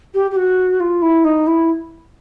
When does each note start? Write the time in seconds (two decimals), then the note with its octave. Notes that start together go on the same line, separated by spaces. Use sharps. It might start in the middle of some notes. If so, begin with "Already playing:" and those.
0.14 G4
0.30 G4
0.36 F#4
0.80 F4
1.01 E4
1.24 D#4
1.46 E4